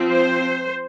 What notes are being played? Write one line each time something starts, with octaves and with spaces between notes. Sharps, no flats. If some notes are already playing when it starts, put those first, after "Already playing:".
Already playing: F3 C4
C5